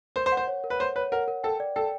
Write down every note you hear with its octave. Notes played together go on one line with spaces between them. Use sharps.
A#4 C5
C5
F#5
C5
C#5
A#4
B4
C5 C#5
B4 C#5
A#4 F#5
A#4
A4 G5
D5
A4 G5